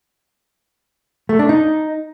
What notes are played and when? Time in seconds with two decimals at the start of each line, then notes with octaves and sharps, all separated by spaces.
1.29 A3
1.39 D4
1.49 D#4